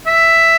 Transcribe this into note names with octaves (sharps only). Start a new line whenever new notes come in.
E5